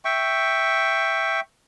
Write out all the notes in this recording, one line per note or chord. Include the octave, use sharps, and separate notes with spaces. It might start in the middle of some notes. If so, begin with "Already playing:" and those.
E5 G5 C#6